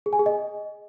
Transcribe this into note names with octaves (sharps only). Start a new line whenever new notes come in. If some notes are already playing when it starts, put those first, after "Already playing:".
G#4
G#5
G#4
D#5